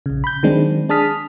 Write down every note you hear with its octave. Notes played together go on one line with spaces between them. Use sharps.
A#1 C#3
B5 G6
D#3 F#3 G#3 C4 D4
D4 G#4 A5 D#6 F6 B6